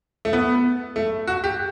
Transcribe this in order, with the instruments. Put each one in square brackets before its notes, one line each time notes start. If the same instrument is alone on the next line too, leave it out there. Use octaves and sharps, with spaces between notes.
[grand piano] A3
B3
A3
F#4
G4